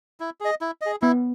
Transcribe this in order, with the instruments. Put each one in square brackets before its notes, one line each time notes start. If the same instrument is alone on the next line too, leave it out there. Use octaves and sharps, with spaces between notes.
[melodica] E4
G#4 D#5
E4
G#4 D#5
[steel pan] B3 [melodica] E4